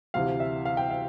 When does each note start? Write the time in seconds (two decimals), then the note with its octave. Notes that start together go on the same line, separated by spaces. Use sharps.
0.14 D2 C3 E3 F5
0.40 E5
0.65 F5
0.77 G5
0.91 F5